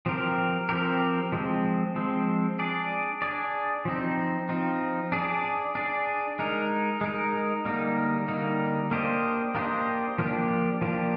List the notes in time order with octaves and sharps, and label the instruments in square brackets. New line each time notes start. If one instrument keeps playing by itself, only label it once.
[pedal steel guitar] F3 C4 G4 A#4
F3 C4 G4 A#4
F3 G#3 C4
F3 G#3 C4
D4 G#4 D5
D4 G#4 D5
F3 C4 D#4
F3 C4 D#4
D4 G#4 D5
D4 G#4 D5
G#3 D#4 A#4
G#3 D#4 A#4
D3 G3 A#3 D#4
D3 G3 A#3 D#4
A#3 D4 G4 C5 D#5
A#3 D4 G4 C5 D#5
F3 A#3 D4 G4
F3 A#3 D4 G4